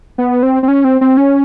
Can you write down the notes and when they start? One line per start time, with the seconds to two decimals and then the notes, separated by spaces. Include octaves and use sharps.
0.18 B3
0.43 C4
0.63 C4
0.68 C#4
0.84 C4
1.01 C4
1.17 C#4